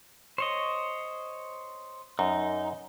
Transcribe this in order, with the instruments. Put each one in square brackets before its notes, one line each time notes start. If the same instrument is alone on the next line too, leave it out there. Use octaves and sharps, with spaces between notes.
[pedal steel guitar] C5 C#5 D#5
[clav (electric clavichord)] F#2 [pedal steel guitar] D#4